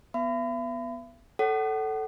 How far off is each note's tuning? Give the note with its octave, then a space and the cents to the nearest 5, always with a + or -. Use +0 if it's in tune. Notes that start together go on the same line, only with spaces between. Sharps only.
B3 +0 E5 +45 B5 +35
A4 +0 C#5 +0 F#5 +30